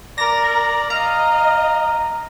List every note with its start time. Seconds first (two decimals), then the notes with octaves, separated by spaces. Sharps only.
0.18 A#4 D5 A#6
0.90 D#5 F5 A#5